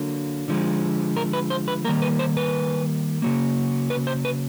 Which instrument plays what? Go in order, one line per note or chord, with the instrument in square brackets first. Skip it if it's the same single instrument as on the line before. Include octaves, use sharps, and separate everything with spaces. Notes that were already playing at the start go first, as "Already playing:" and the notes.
Already playing: [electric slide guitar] D3 F#3 A#3
D3 F3 G#3
A#4
B4
C5
B4
D#3 G3 A#3 A#4
B4
C5
B4
C#3 F#3 A#3
B4
C5
B4